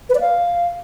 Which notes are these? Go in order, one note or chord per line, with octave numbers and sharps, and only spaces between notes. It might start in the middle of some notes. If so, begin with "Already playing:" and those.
B4
D5
F5